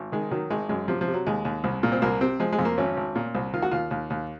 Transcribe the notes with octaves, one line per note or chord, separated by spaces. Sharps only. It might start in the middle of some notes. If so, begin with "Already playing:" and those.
Already playing: G#1
D#3 G#3
D#3 F#3
G#1 G#3
F#2 G#3
C3 F3
F3
C3
F#3
D#2 G#3
D#2
C2
A#2
C4
C2 A#3
C3 C4
F3 G#3
G#3
F2
A#3
G#1 C#4
G#1
A#2
C2
D#3 F4
F#4
D#2 F4
D#2
D#2